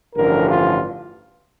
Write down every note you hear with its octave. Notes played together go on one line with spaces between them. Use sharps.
A1 G2 D3 F3 A#4
F4